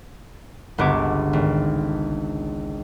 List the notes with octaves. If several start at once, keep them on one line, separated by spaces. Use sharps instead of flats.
G1 C#2 B3 D4 C#5 D6
G#1